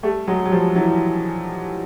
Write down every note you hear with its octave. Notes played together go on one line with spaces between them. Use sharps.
G3 A3
F#3 G#3
F#3
F3 G3
E3 F#3